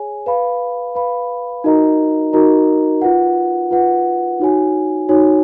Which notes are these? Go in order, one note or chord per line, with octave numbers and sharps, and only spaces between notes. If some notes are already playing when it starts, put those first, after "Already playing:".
Already playing: G#4 C#5 G#5
B4 F5 B5
B4 F5 B5
D#4 F#4 A#4 D#5 A#5
D#4 F#4 A#4 D#5 A#5
F4 B4 F#5
F4 B4 F#5
D#4 F#4 C#5 G#5
D#4 F#4 C#5 G#5